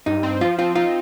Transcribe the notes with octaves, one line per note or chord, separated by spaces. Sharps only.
G2 D#4
C4
F3 F4
C4 F4
D#4 F4